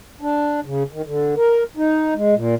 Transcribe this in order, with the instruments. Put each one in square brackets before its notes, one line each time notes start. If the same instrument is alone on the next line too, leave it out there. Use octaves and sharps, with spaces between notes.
[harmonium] D4
C#3
D#3
D3
A#4
D#4
G#3
A#2